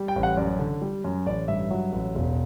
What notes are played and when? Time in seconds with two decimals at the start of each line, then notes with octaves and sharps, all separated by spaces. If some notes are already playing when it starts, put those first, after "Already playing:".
Already playing: G3
0.08 G5
0.16 A1
0.23 F#5
0.37 F#2 D5
0.59 D3
0.81 G3
1.04 F#2
1.26 A1 D5
1.48 G2 E5
1.71 F#3
1.92 A1
2.15 E1